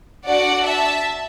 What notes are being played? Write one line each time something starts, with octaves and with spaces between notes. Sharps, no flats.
D4 F#4 A4 D5 F#5
E5 A5